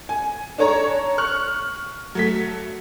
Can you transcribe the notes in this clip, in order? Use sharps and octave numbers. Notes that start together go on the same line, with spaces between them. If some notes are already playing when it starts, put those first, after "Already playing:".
G#5
D4 A4 C#5 A#5 C#6
C#6 F6 F#6
F#3 A3 B6